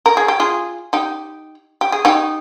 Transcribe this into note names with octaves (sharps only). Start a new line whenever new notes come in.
A#4
G#4
G4
F4 G#4
D#4 G4
G4
G#4
D#4 G4